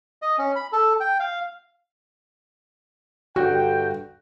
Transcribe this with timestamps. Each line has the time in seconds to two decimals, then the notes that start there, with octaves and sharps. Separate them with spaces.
0.22 D#5
0.38 C#4
0.56 B5
0.73 A4
1.00 G5
1.20 F5
3.36 G2 D3 F#4 G5